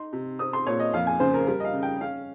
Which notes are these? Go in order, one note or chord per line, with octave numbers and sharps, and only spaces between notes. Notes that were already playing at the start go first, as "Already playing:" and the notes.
Already playing: D#4 C6
C3
C4 D#6
C6
A#2 C#5
D#5
F2 F5
G#5
C#3 C5
A#4
G3 A#4
D#5
F5
C#3
G5
C#4 F5